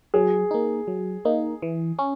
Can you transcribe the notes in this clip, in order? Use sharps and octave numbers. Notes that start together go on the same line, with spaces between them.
F#3 G#4
A#3 D#4
F#3
A#3 D#4
E3
C#4